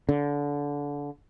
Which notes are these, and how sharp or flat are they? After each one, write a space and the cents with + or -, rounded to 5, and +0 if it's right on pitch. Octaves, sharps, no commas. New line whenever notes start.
D3 -25